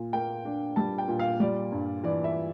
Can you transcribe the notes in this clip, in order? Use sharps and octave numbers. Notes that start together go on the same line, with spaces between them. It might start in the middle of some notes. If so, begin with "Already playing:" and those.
Already playing: A#2
A#3 G5
D4
G3 A5
G5
A#2
F5
G3 D5
G2
E3 D5
E5